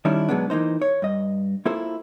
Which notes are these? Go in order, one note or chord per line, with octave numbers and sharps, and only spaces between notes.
D#3 G3 C#4 D4 E4
B2 F#3 G#3 B3 D4
E3 A#3 D#4 C5
C#5
G2 D#5
A#3 E4 F4 A4 C5